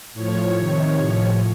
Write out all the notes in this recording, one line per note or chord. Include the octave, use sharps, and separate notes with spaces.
A2 F3 C#5
C3 D#3
A2 F3